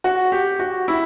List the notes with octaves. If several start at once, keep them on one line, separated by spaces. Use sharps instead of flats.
F#4
G4
F#4
E4